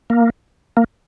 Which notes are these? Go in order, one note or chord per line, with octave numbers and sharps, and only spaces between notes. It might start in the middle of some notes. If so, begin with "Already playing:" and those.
A#3
A#3